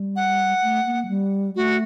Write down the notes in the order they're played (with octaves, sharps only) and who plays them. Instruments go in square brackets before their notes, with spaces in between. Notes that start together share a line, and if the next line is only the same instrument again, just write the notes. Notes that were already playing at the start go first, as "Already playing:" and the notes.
Already playing: [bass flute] G3
[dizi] F#5
[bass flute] A3
A#3
F#3
G3
[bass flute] A3 [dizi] F#4